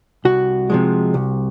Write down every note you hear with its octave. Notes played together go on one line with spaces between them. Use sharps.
C2 F#4
C3 F3 G#3
C2